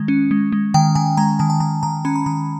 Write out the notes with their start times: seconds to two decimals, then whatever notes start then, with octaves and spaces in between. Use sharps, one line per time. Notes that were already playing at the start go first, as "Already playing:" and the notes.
Already playing: D#3 G#3
0.08 C#4
0.31 G#3
0.52 G#3
0.74 D#3 G5
0.95 D#3 G#5
1.17 G#3 A#5
1.39 D#3 A5
1.50 A5
1.60 D#3 A#5
1.83 D#3 A#5
2.05 C#4 B5
2.16 B5
2.26 D#3 A#5